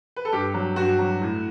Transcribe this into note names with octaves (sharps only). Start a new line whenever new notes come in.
B4
A4
G2 G4
F#3
G2 F#4
F#3
A2